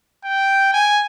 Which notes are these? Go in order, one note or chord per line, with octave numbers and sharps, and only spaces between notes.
G5
G#5